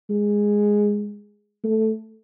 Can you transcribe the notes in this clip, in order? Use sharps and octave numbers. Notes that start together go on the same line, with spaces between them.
G#3
A3